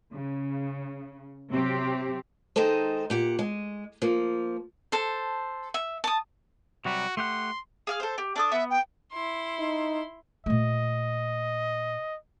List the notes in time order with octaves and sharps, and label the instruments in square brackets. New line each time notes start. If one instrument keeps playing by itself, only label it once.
[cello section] C#3
C3 F#3 C4 G4
[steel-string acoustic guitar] D#3 G#3 D#4 A4 C5
A#2 G4 F#5
G#3
F3 A#3
[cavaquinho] A4 C5
E5
A5 D#6
[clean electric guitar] C3 F#3 G3 [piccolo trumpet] F#4
[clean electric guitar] A3 G4 F#5 [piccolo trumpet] C6
[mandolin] G#4 F5 F6
A4 C5
G4
D4 A4 D#6
[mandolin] B3 [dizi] E5
[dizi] G5
[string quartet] E4 C6
[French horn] D#4
[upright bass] A#2 A3 [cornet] D#5